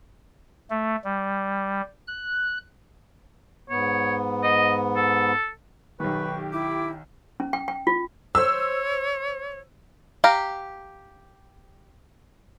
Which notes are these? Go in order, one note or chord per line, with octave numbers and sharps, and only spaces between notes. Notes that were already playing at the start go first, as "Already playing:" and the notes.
A3
G3
F#6
G#2 B3 C#5
D#5
A4
B1 D#3 G4 B4 C#6
E4 D6
C#4
G5
G5
F4
C5 C#5 E6
G4 F5 A#5